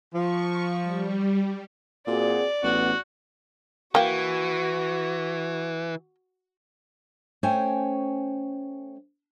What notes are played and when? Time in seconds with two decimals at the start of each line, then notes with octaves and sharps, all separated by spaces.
0.15 F3 C#6
0.82 G3
2.07 A#2 C4 F#4 G#4 D5
2.63 A1 B3 F#4
3.95 E3 A#3 F#4 G5
7.43 A3 C#4 C5 C#5 G5 G#5